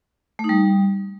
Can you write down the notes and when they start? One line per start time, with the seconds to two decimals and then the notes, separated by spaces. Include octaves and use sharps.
0.39 A3
0.44 D#4
0.49 G3